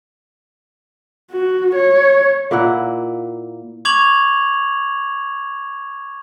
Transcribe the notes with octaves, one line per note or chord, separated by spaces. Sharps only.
F#4
C#5
A#2 A#3 E4 F#5
C#6 D6 G#6 F7 F#7